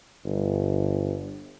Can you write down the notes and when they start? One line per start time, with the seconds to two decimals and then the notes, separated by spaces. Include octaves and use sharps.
0.25 G1